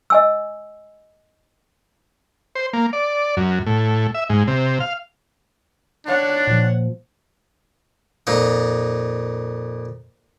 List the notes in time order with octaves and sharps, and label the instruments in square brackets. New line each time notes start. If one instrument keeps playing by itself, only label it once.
[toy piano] D#5 G#5 E6
[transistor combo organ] C5
A#3
D5
F#2
A2
E5
G#2
C3
F5
[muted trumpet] D4 [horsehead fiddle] C#5 F#5
[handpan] A#2 F3
[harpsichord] F2 A#2 D#4